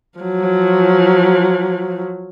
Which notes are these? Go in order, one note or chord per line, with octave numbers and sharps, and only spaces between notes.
F3 F#3